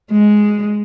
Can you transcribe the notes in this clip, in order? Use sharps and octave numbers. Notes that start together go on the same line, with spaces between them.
G#3